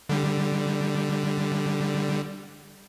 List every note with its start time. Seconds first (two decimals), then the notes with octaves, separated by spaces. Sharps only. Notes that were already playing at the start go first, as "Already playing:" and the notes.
0.09 D3 G3